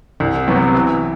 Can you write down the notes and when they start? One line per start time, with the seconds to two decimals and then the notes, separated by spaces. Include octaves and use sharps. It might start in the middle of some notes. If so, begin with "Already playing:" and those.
0.20 C2
0.48 C3 F#3 B3 F#4
0.74 E3